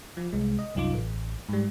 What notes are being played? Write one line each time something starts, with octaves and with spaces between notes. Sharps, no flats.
F3
C2 G#3
D#5
C2 F#2 D#4 F4 D6
A1
G#2 G3